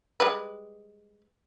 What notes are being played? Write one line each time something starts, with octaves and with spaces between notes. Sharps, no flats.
G3 G#3 B4